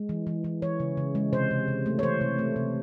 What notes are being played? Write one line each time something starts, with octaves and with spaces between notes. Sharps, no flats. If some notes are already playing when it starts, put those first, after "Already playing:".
Already playing: G#3
E3
E3
E3
E3 C#5
C#3
C#3
G#3
C3 C5
C3
C3
A3
C#5
E3 C5
C3
A3
C3